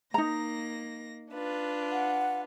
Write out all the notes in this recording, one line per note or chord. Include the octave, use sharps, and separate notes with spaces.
A#3 D#4 A#5 A#6
D4 F4 B4
F#5